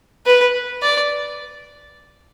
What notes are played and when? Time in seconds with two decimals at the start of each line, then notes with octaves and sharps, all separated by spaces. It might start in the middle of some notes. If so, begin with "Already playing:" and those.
0.26 B4
0.82 D5